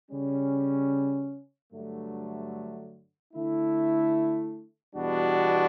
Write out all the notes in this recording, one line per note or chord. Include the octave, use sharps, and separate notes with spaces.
C#3 G3 C#4
G2 D3 F#3 A3
D3 A3 E4
E2 B2 G3 D4 F#4